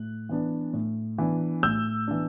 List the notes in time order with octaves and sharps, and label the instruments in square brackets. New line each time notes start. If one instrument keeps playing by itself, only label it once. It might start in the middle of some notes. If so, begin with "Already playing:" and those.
Already playing: [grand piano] A2 F#6
E3 B3 D4
A2
E3 B3 D4
A2 E6 G6
E3 B3 D4